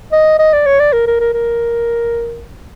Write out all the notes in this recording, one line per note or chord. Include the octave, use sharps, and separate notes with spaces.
D#5
D#5
D5
C#5
D5
A#4
A#4
A#4
A#4